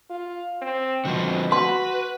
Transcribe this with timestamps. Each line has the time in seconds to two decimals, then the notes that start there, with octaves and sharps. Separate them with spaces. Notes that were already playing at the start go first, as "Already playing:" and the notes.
0.10 F4
0.62 C4
1.05 B2 D3 F3 C4
1.52 F#4 B4 C6